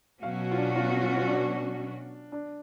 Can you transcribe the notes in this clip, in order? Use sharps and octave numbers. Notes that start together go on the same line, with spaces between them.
B2 F#3 C#4 F#4 F5
F4
D4
F4
F4
F4
D4
D4